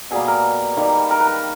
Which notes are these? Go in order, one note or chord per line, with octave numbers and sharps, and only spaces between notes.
B2 G3 A#3 G#4
A#4
D#3 G3 A#3
A#4
B4
A#4